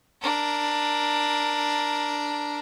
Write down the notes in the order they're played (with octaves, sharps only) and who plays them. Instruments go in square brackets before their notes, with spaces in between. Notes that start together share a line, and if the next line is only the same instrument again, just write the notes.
[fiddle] D4 A#4